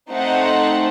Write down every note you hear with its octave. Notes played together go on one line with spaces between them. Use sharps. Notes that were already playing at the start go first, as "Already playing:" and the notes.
A3 C4 D#4 C5 F#5